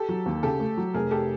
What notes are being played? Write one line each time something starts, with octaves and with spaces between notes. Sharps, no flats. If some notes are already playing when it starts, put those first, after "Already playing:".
Already playing: G4 A4
F#3
D#2
C#3 G4 A4
A3
F#3
F1 G#4 A#4
G4 A4